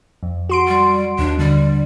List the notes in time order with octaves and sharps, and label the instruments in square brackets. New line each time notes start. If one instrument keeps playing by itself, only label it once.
[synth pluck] F2
F#4 C6 D7
[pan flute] G3
[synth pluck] D#2 [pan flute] D4
[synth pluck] D3 [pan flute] G3